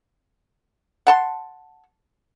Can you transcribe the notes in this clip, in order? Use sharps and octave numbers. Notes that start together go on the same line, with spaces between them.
F#5 A5 C6